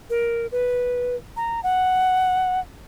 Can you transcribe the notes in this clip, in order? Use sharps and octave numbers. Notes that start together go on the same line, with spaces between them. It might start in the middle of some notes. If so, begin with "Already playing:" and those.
A#4
B4
A#5
F#5